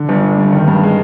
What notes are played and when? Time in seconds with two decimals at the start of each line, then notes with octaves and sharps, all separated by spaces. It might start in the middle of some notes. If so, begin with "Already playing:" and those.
Already playing: D3
0.09 G1
0.23 D3
0.38 G2
0.53 D#3
0.68 G2
0.83 G#3